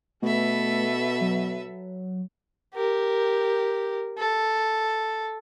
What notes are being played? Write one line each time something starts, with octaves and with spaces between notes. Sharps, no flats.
B2 A3 A4 B4 E5
F#3
G4 A#4
A4